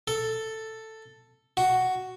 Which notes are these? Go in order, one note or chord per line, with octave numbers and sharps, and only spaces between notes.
A4
F#4